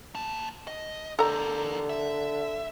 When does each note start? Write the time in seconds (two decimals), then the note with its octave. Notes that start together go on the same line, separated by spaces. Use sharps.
0.15 A#3 A5
0.67 D#5
1.19 D3 G4 A4 A#4 A#5
1.89 E5